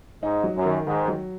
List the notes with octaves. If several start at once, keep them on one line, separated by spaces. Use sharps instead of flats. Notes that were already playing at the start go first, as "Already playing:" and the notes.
G#2 D#4
F#3
F#2
D#3
G#2 D#3
F#3